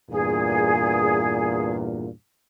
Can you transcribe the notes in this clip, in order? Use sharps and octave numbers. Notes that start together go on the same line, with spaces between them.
E2 G2 A#2 G#4